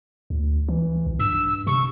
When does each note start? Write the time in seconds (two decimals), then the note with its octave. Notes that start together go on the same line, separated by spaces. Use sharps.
0.30 D2
0.68 E3
1.06 B1
1.19 G2 E6
1.67 C3 C#6